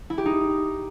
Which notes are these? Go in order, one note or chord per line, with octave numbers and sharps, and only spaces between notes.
E4
G4
D#4